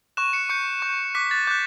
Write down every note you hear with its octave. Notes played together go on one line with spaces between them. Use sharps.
C#6 F#6 E7
C#7
C#6 G6 C#7
C#6 G6
D6 F#6 B6
A6
D6 F#6 G6